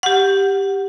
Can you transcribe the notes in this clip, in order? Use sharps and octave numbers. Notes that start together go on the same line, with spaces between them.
G4 F#5